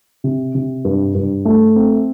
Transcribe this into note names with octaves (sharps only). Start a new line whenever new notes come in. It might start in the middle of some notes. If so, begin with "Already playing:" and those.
C3
C3
G2
G2
A3
C4